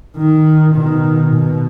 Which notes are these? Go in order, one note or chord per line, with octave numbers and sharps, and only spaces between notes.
D#3
B2 D#3
B2